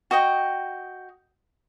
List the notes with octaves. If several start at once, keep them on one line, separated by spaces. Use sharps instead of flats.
F#4 D#5 G5